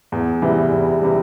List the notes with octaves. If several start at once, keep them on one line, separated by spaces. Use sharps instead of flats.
E2
C3 E3 G3
E2
C3 E3 G3